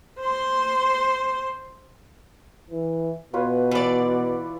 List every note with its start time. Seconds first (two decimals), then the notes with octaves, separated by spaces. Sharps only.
0.20 C5 C6
2.70 E3
3.34 B2 F4 B4 C#5
3.71 E3 D5